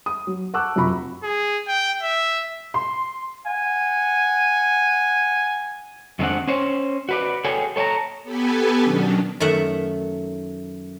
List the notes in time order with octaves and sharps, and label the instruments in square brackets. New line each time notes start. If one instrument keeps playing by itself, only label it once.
[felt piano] D#6
F#3
F#5 A5 C#6 D6 E6 F#6
F#2 C3 F4 A#5 B5 C#6
[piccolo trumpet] G#4
G5
E5
[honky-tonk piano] C6
[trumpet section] F#5 G#5
[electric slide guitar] F2 D#3 G#3 C4 D4 F#5
C#4 C5 C#5
F#4 B4 D5
F#4 G#4 A4 C#5 G5 G#5
A4 C#5 G5 A5 A#5
[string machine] B3 G4 A4 B4 G#5
B2 D#3 F#3 C#4 D4
[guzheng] F#2 D#3 A3 E5 F#5